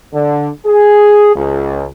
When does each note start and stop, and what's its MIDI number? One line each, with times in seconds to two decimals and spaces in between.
0.13 0.48 50
0.66 1.32 68
1.36 1.87 37